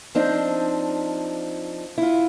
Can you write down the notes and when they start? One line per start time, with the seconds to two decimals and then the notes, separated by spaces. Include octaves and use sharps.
0.15 F3 C4 D4 D#4
1.98 E4 F4